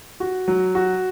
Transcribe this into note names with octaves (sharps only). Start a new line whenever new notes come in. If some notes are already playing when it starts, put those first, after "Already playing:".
F#4
F#3
F#4